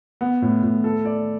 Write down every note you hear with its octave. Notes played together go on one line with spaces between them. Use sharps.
B3
A2
A2
A4
D5